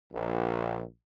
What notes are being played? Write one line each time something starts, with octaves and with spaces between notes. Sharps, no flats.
A#1